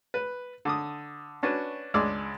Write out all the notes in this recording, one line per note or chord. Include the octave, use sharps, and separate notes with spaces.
B4
D3 D6 D#6
C#4 D4 F#4 B4
C#2 G#3 D4 D5 E6